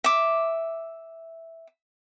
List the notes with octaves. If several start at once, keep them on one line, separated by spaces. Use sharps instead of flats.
E5 D6